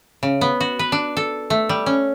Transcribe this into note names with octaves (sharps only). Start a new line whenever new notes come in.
C#3
B3
F#4
B4
D4
A4
A3
G3
C#4